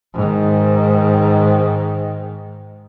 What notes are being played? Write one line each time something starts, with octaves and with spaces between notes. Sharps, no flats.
G#2 D#3